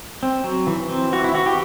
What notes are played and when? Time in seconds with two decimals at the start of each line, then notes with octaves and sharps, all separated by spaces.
0.23 C4
0.44 F#3
0.67 E3
0.89 C4
1.13 E3 F#4
1.24 E4
1.34 E3 F#4
1.46 G4